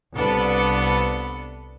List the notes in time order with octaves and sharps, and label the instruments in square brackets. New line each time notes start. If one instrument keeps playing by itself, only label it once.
[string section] C2 B3 D4 A4 B4 C#7